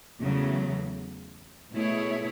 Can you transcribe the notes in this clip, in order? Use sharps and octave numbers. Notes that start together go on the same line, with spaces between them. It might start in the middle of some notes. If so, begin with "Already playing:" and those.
E2 C#3 F#3 A3
B2 A3 E4 G#4 C#5